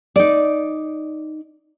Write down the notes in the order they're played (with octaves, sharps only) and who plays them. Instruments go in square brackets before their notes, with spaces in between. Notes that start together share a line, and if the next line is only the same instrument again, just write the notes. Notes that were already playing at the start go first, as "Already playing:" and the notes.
[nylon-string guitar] D#4 D5